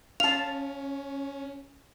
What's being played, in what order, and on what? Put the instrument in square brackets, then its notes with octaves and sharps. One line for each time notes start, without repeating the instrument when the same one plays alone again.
[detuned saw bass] C#4 [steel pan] F5 A5 [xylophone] F7